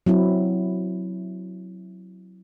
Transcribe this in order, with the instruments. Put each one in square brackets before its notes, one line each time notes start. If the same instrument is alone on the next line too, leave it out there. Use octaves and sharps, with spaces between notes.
[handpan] F#3 C4 E4